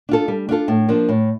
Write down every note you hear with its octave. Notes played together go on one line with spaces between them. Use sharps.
D4 F4 A4
G3
D4 F4 A4
A2
F3 A#3 D4
A2